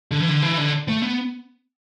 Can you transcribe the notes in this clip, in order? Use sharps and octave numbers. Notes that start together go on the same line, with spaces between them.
D3
E3
D3
E3
D3
A3
B3